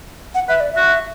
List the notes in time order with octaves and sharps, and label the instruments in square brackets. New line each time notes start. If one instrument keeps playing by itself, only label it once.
[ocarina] F#5
[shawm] B4 [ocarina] E5
[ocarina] D5
[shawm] F#4 [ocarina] E5